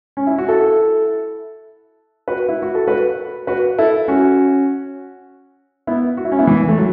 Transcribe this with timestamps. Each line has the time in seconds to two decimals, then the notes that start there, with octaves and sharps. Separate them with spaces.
0.17 C#4
0.27 E4
0.38 F#4
0.48 E4 A4
2.28 F#4 B4
2.49 E4
2.62 F#4
2.75 A4
2.88 F#4 B4
3.47 F#4 B4
3.78 E4 A4
4.08 C#4 F#4
5.87 B3 E4
6.17 F#4
6.25 E4
6.32 C#4
6.39 B3 E4
6.47 E3
6.68 A3
6.78 F#3